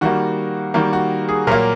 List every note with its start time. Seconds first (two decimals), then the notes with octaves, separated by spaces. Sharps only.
0.01 D#3 G3 A#3 F#4
0.74 D#3 G3 A#3 F#4
0.93 F#4
1.29 G#4
1.47 A#2 F#3 A#3 A#4